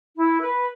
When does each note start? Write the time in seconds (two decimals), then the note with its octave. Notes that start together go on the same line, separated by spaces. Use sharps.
0.16 E4
0.40 B4